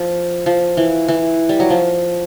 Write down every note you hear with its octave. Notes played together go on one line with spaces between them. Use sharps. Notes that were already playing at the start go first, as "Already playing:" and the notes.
Already playing: F3
F3
E3
E3
G3
F#3
F3